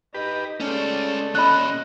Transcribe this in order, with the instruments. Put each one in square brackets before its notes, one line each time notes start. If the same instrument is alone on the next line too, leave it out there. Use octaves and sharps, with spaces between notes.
[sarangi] D#4 [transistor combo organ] G4 B4
[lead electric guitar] G#3 C#4 [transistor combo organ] A3 [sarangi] D5
[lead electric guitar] A#2 C#4 [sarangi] D#5 [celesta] B5 F#6